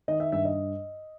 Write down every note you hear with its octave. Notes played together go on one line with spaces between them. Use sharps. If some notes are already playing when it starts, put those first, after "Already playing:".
D#3 D#5
E5
G2 E5
D#5